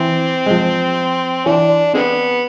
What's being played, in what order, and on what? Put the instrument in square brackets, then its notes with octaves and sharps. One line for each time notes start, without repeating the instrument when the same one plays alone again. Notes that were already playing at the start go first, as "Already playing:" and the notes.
Already playing: [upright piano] E3 [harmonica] C4
[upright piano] G#3
F3
[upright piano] E3 [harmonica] D4
[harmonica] D3 G#3 B3 [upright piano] C4